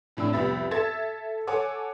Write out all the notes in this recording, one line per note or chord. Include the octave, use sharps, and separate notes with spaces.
F2 A2 D4 E6
C2 F2 G3 B3 E5 A6
A4 E5 A5 G#6 A6 E7
A4 C#5 F#5 G#5 D6